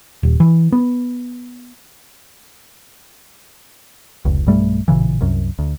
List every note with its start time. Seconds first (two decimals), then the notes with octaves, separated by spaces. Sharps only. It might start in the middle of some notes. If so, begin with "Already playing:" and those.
0.23 D#1
0.40 E3
0.72 B3
4.25 F1 C#2
4.47 B1 G2 G3 A3
4.88 A1 A#2 C#3 E3
5.21 C2 F#2
5.59 D2